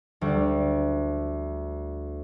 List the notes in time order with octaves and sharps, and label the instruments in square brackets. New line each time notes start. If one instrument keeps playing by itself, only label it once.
[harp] D2 G3